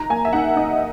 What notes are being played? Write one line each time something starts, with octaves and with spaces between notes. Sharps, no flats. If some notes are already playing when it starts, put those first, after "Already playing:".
Already playing: D#4 A#5
A#3 G#5
E5
D#4 F#5
D#4 D#5